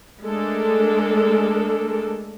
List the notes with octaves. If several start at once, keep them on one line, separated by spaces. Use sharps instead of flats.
G#3 A3 D4 A4 A#4